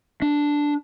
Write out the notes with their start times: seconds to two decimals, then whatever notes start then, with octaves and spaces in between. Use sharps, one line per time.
0.22 D4